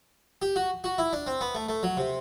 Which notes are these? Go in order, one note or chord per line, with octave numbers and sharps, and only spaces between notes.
G4
F#4
F#4
E4
D4
C4
B3
A3
A3
F#3
C3